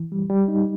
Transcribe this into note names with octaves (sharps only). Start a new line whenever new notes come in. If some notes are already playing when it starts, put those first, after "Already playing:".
Already playing: E3
G3
G3
D#4